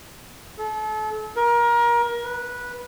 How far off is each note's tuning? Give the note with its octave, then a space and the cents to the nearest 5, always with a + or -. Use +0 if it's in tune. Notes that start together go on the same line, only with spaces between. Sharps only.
A4 -35
A#4 +25
B4 -15